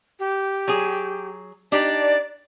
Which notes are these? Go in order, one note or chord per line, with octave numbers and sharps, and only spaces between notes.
G4
F#3 G#4
D4 D#4 G4 D5